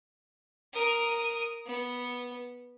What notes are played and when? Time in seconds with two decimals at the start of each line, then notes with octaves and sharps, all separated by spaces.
0.73 A#4 D#6
1.66 B3